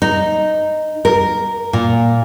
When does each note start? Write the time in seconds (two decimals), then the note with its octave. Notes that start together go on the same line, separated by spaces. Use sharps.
0.02 D#4
1.05 A#4
1.73 A#2